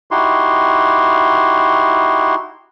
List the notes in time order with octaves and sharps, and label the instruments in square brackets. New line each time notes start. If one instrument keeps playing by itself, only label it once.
[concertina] D#4 E4 F#4 G4 C6